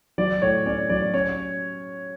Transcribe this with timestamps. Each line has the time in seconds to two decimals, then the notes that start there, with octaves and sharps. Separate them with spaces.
0.18 F#3 D5
0.42 A2 C#5
0.66 C#4 D5
0.89 F#3 D5
1.13 C#4 C#5